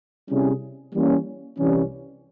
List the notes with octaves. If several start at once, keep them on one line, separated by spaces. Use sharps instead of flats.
C3 G3 C#4 E4 G#4
E3 G3 A#3 C#4
C2 C3 E3 G3 C#4